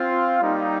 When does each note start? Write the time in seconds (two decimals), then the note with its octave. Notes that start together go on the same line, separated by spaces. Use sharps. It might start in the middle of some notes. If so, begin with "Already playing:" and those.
Already playing: C4 F4
0.41 G3 A#3 D#4